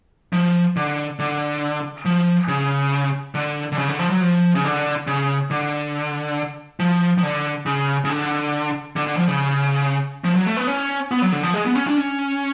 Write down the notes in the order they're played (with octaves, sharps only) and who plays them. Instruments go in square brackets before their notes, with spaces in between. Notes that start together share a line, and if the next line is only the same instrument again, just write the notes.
[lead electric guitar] F3
D3
D3
F3
C#3
D3
D3
C#3
D3
F3
F#3
F3
C#3
D3
C#3
D3
F3
F3
D3
C#3
C#3
D3
D3
D3
F3
C#3
F3
F#3
A3
B3
C#4
B3
F#3
D3
F3
G#3
B3
C#4
D4
C#4